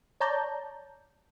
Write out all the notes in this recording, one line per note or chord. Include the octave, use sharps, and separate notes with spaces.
C#5 D5 A5 A#5 G6